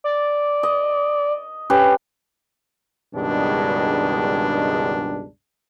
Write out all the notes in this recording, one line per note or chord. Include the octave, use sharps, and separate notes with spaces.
D5
D#5
C#4 G4 B4
C#2 G2 B2 D#3 G#3 D4